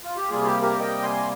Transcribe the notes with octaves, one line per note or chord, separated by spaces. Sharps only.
F4
G4
C3 G3 A#3 F4 G#4
G4
G4 A#4
D#5 G5
G#5 C6